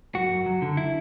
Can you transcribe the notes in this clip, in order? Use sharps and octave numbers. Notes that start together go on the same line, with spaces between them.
F#2 F#4
F#2
F#3
D3
E4